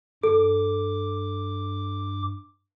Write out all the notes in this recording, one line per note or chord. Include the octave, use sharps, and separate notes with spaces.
G2 A4 D6